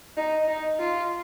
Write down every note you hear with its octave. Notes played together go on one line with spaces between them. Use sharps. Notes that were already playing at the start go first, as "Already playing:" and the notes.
D#4
D#4
F4